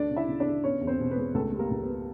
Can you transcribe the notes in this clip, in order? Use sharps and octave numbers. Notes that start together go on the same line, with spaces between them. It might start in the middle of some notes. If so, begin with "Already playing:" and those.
Already playing: D2 D4 D5
C#3
E4 E5
C#3
D4 D5
C#3
B3 C#4 C#5
E2
C4 C5
B2
B3 B4
G#3
C#2 A3 A4
G3
A#3 A#4
C#2
B3 B4